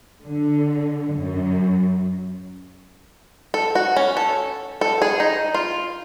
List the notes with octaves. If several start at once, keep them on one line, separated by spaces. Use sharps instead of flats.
D3
F#2
A4
F#4
C#4
A4
A4
G#4
D#4
F4